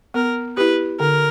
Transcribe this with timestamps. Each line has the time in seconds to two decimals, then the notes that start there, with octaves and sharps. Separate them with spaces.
0.14 B3 A#4
0.57 E4 G4 B4
1.00 D3 A#4